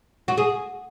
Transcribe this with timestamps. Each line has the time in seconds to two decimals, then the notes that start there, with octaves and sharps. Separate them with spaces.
0.28 F#4
0.38 G#4